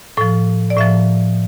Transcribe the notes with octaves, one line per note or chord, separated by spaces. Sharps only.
A2 F3 A4
D5
A2 F3 E5